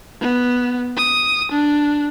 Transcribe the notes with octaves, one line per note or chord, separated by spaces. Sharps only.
B3
D#6
D4